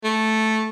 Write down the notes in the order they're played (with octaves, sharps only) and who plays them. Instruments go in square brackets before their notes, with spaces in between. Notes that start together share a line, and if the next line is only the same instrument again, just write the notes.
[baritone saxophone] A3